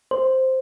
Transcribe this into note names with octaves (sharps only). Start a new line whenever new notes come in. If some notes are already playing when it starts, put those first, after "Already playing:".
C5